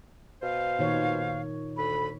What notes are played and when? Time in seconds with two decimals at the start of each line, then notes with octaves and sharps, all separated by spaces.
0.42 B2 C5 F5
0.79 A#2 D#3 C#5
1.77 D2 A4 B5